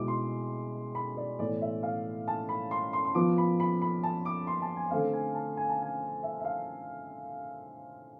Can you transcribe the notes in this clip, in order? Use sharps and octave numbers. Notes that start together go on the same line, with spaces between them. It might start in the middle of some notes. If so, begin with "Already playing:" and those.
Already playing: B2 G#3 B3 E4 D6
C6
B5
D5
A2 E3 B3 D5
E5
F5
A5
B5
C6
C6
C6
F3 B3 F4 D6
B5
B5
B5
A5
D6
C6
A5
G#5
D3 A3 C4 F5
G#5
A5
G#5
A5
G#5
E5
E5
F5